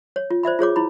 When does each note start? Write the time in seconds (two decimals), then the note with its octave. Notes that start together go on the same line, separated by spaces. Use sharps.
0.16 C#5
0.30 F4
0.43 C5 D5 E5 B5
0.59 F4 G#4 C#5 D6
0.76 E4 B5